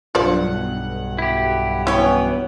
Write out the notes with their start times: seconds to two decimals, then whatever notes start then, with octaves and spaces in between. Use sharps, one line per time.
0.15 B1 G2 F4 C5 D5 F#5
1.19 E4 G4
1.87 E3 B3 C#4 E4 C#5 G5